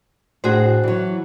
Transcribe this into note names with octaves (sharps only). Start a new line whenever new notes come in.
A2 D4 F#4 G#4 C5
E3 F#3